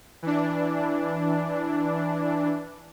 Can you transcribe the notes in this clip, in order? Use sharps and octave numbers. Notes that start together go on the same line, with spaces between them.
E3 D4